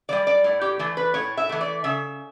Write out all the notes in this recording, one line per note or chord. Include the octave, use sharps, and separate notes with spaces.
E3 G3 D5
D5
A2
G4
E3 A3
B4
A2 C#5
E5
E3 A3
D5
C#3 E5